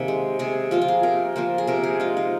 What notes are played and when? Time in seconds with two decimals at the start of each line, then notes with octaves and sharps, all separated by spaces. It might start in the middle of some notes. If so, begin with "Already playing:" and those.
Already playing: C3 D#3 A#3 G#4
0.08 G#3
0.39 C3 G#4
0.71 F3 A#3 F4
0.82 F4
0.88 G#4
1.03 C3 A#4
1.36 F3 A#3 C5
1.58 G#4
1.67 C3 A#4
1.84 G#4
2.00 G#3 F4
2.17 D#4